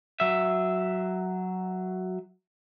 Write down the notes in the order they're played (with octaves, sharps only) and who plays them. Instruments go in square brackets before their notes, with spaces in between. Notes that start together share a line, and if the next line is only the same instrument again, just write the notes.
[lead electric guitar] F#3 E5